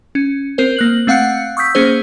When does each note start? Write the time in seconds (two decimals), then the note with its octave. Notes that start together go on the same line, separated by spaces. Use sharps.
0.15 C#4
0.58 C4 A#4 C5
0.76 A#3 F#6 F#7
1.07 A3 C4 F5 F#5 F#6 C#7
1.57 C#6 D#6 E6 G6 B6
1.75 A#3 C#4 G#4 C5